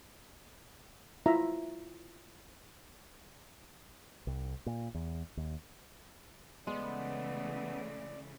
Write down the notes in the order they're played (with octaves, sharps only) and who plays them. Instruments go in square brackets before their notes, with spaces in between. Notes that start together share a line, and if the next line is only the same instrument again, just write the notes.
[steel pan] E4 F4 E5 A#5
[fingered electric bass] C2
A#2
E2
D#2
[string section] C#3 E3 A3 [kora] G#3 [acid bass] B3 [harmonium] D5